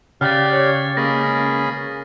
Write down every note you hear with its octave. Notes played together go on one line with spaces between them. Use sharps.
C#3 G4 D5 F5 F#5 F6 A6
C#5
B2 G#3 A#3 C#4 G#4 B5 A#6